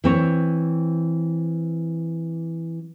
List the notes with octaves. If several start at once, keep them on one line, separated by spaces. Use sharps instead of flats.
E3 C4 C#5